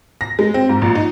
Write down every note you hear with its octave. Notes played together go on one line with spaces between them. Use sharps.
A#6
G#3
C4
G#2
A#1
D#4